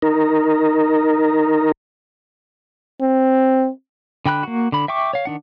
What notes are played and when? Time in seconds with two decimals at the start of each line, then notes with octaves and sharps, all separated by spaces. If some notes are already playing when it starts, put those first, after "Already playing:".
0.02 D#4 A#4
3.01 C4
4.26 D3 G5 B5 F#6
4.43 A#3 F#4
4.72 D3 B5
4.88 E5 G5 C#6 D6
5.13 C#5 F5
5.25 D#3 D4 F#5